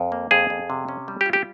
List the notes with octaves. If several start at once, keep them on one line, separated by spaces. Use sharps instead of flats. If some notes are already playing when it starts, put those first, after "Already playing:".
Already playing: F2
A#3
F2 G#4
F2
C3
C#4
G3
G4
F4
G4